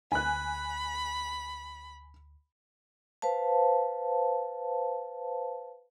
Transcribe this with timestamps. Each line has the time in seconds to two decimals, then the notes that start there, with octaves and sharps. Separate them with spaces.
0.12 D2 G#5 B5 F#6
3.22 B4 C5 F5 A5